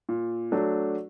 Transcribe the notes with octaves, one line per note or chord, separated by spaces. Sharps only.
A#2
F#3 A3 D4